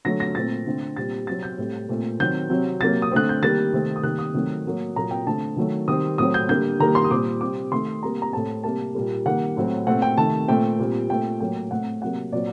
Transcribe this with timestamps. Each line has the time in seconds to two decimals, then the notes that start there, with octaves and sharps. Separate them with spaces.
0.05 D3 F#3 A3 A#6
0.20 A#6
0.35 A#2 A3 C4 A6
0.66 D3 A3 C4
0.96 A#2 G3 C4 A6
1.27 C3 F#3 C4 A6
1.43 G6
1.58 A2 G3 C4
1.89 A#2 A3 C4
2.20 D#3 F#3 C4 G6
2.50 C3 F#3 C4
2.81 C3 F#3 A#3 A6
3.02 D#6
3.12 D3 A3 C4 F#6
3.29 G6
3.42 D#3 G3 A#3 A6
3.73 C3 D#3 A3 C4
3.96 D#6
4.03 D#3 G3 A#3 F#6
4.19 D#6
4.34 C3 D#3 F#3 A3 C4
4.66 A2 F#3 A#3
4.96 A#2 F#3 A#3 A#5
5.11 G5
5.26 D3 A3 C4 A5
5.57 D#3 F#3 A3
5.88 D#3 G3 C4 D#6
6.18 A2 F#3 C4 D#6
6.34 G6
6.49 D3 G3 A#3 G6
6.80 D#3 G3 A#3 A#5
6.95 C6
7.04 D#6
7.11 A#2 G3 C4 D6
7.41 C3 G3 C4 D6
7.71 D#3 A3 C4 C6
8.03 C3 G3 A#3 A#5
8.22 A#5
8.33 A2 A3 C4 A5
8.64 C3 G3 A#3 A5
8.95 A#2 G3 A#3
9.26 D#3 G3 A#3 F#5
9.57 A2 F#3 C4
9.87 A#2 A3 C4 F#5
10.02 G5
10.18 C3 D#3 A3 A5
10.48 A#2 A3 C4 G5
10.79 A#2 G3 C4
11.09 A#2 A3 C4 G5
11.40 A2 F#3 A#3 G5
11.71 A2 A3 C4 F#5
12.02 C3 F#3 A#3 F#5
12.32 A#2 F#3 C4 D5